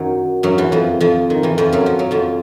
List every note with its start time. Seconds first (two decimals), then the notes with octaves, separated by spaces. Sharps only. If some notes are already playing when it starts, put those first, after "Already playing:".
Already playing: F#2 D#3 F#3
0.43 F#2 F#3
0.58 E2 E3
0.72 F2 F3
1.01 F2 F3
1.30 D#3
1.43 E2 E3
1.58 F2 F3
1.73 F#2 F#3
1.86 F3
1.99 F#3
2.11 F2 F3